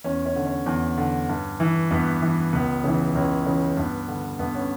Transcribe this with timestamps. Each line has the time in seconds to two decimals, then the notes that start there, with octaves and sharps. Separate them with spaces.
0.04 E2 C#4
0.26 C#4
0.36 D3
0.46 C#4
0.66 E2
0.97 D3
1.29 G2
1.60 E3
1.91 G2 B3
2.22 E3
2.53 C#2 B3
2.84 C#3 E3
3.15 C#2 C#4
3.46 C#3 E3
3.77 G2 B3
4.08 D3
4.39 G2 B3
4.55 C#4